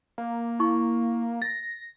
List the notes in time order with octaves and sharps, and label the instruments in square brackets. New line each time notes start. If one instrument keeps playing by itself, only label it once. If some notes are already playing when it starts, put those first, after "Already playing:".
[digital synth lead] A#3
[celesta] E4 C#6
[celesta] A6 [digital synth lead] A#6